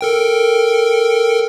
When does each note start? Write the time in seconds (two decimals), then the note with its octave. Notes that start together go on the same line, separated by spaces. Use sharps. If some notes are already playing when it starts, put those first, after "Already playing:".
0.01 A4 A#4 G5